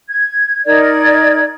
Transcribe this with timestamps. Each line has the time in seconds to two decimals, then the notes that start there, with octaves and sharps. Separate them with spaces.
0.08 G#6
0.65 D#4 A#4 D5 G#6